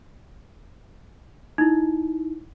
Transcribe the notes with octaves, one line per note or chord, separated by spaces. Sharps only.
D#4 E4